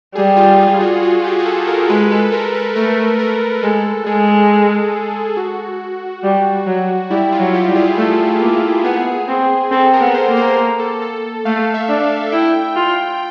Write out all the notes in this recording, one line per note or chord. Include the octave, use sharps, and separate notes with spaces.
G3 G#4
F4
F4
F#4
F4
G4
G#4
A4
A#4
G#3 B4
A4
A#4
B4
A3 A#4
A#4
G#3 A4
G#3 G#4
F#4
G3
F#3
G3 E4
F4
F#3
G4
G3
G#4
A3 A4
A#3
B3 G#4
C4
C4 A4
A#4
B3
C5
A#3
C5
A4
A4
A3 F5
E5
D4
F5
E4 G5
F4